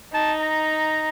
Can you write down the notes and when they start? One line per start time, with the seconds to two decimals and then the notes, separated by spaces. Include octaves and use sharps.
0.13 D#4 A5
0.41 A#5